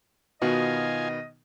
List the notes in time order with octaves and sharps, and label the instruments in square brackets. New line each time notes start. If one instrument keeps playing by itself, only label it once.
[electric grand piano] B2 D#3 B3 [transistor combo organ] F4 G#5 [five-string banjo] F#4 [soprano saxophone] D#5